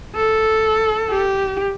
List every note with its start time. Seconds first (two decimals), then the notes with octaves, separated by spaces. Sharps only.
0.15 A4
1.10 G4